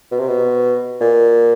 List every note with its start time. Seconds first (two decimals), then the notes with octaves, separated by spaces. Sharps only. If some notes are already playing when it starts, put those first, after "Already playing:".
0.11 B2
0.19 C3
0.28 B2
1.01 A#2